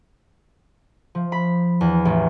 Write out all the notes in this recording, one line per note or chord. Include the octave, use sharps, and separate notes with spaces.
F3
B5
E2
A1